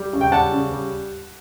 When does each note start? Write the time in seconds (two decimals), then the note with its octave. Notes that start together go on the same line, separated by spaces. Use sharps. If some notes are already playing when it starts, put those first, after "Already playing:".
Already playing: G3
0.13 C#3
0.21 G5
0.32 G3 F#5 A5
0.52 C#3
0.72 G3